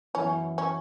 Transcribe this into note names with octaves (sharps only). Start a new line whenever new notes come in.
F#2 E3 B3 C#4 E4
C#4